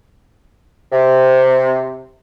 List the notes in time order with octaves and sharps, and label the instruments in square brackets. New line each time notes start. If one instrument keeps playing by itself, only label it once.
[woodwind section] C3